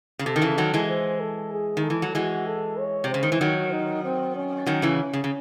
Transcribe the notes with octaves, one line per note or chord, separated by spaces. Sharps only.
C#3
C3 A4
D#3
C#3 E3
D#3 F#3
E3 G#3
C5
A4
G#4
D#3
A4
E3
F#3
E3 G#3 F#4
A4
C#5
C3
C#3 C5
D#3
E3
D#3 F#3 C#5
D#4
C4
C#4
D#3 F#3
C#3 E3
C#3
C#3